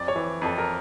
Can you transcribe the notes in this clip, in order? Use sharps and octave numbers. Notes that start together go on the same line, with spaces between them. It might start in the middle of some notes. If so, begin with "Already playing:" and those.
Already playing: F2 D5
C#5
E3
F2 A4
A#4